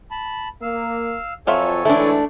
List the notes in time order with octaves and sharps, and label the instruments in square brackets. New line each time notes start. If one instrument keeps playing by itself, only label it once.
[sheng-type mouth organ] A5 B5
[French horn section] A#3 [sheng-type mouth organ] F5 E6
[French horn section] F2 [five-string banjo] F#3 F4 E5 [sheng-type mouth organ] A4 C#5 G#5
[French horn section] G#2 D3 E3 [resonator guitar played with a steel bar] A3 D4 [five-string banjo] E4